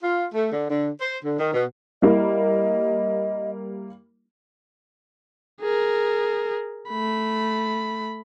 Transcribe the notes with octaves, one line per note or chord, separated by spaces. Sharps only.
F4
A3
D3
D3
C5
D3
D#3
B2
G3 A#3 E4 D#5
G#4 A#4
A3 B5